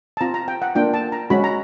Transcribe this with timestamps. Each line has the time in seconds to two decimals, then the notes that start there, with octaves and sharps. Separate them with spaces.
0.17 A5
0.21 C4 F4 A#5
0.34 A#5
0.48 G5
0.62 F#5
0.75 A#3 D4 F4 G5
0.94 A5
1.12 A#5
1.30 G#3 C#4 F#4 B5
1.44 A#5